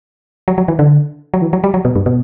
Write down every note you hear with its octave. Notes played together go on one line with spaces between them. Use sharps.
F#3
F#3
E3
D3
F#3
E3
F#3
G3
F#3
B2
G2
B2